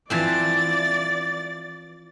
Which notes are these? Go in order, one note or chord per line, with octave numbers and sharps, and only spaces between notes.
E3 F3 C4 D5 A6